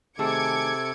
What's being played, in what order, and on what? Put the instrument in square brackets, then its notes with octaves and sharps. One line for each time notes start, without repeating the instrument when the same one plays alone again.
[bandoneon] C3 A4 [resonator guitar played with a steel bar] D#3 A3 G#4 [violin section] D6 G#6 C#7